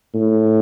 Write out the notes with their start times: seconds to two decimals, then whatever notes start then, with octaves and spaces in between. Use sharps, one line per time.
0.14 A2